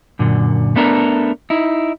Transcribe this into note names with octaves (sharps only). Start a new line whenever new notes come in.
F#2 A#2 D3
A3 B3 D4 A4 A#4
D#4 E4